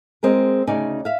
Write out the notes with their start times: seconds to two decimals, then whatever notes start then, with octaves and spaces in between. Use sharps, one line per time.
0.23 G#3 C4 G#4 A#4
0.67 D2 C#3 D#4 D5 G#5
1.05 E5 F5